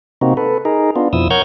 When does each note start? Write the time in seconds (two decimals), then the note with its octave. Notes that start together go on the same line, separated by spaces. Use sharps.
0.21 C3 A#3 C4 D#4 F#4
0.37 A4 B4
0.65 D#4 G#4 A#4
0.96 B3 D4 F4
1.13 F2 B2 F3 E4 D#6 E6
1.30 A#4 C#5 F#5 F6 G6 G#6